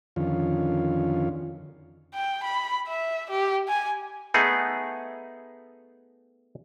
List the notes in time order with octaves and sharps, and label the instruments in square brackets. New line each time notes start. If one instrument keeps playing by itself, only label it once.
[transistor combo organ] F2 D3 D#3 C#4 F4
[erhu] G5
B5
E5
G4
G#5
[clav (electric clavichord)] A3 B3 D#4 G#4